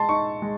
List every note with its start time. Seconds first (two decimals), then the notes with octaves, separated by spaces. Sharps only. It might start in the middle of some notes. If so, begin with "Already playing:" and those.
Already playing: G#3 A5 C6
0.09 D#4 C#6
0.42 G#3